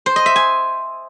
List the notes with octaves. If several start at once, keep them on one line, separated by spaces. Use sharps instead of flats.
C5
D#5
E5
G#5